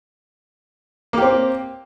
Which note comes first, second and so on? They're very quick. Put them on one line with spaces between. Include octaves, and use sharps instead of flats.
A#3 G4 C4